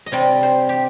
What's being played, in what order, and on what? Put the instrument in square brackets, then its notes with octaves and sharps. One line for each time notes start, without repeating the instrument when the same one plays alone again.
[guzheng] D#5
C3 G3 C4 D5
C5
G4